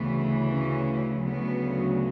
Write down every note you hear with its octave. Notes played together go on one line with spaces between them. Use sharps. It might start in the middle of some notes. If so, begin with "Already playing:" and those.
Already playing: D2 C#3 E3 B3
C#4
D2 C#3 F#3 B3